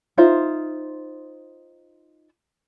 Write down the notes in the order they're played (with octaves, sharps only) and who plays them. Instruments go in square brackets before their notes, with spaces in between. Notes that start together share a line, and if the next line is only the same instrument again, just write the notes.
[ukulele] D#4 F4 C5 E5